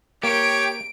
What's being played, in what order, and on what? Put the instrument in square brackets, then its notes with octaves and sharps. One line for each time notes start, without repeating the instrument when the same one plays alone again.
[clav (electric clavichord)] A#3 [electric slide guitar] G4 [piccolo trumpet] C#5 [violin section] D7